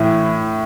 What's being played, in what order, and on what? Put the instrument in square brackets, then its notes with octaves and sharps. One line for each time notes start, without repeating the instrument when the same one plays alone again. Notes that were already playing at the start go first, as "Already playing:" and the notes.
Already playing: [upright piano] A2 [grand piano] E3 E4